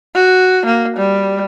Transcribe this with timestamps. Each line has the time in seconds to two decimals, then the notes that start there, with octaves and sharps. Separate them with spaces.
0.15 F#4
0.66 A#3
0.97 G3